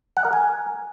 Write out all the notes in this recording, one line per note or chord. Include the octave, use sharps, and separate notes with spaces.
F#5
A#4
G#5